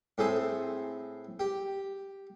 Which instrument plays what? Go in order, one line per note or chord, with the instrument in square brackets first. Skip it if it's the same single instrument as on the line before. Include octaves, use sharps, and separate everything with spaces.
[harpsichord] A2 C4 G#4 A4 C5 D#6
G4